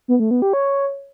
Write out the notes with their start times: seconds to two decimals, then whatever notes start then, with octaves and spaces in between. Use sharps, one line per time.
0.08 B3
0.20 A3
0.31 B3
0.42 G4
0.53 C#5